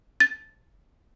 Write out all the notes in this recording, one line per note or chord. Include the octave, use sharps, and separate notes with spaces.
A6